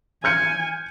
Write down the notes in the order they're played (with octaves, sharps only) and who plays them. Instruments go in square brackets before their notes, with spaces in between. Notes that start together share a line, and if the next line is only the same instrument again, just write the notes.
[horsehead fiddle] G#5 [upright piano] F6 G6 C#7